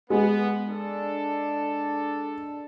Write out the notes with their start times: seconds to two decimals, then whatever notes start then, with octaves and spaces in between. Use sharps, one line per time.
0.10 G#3 B3
0.68 D4 A4